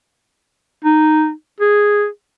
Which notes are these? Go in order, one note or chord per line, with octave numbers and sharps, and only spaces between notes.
D#4
G#4